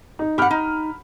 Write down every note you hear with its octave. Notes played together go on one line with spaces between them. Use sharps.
D#4
G4 F#5 B5 F6
D#4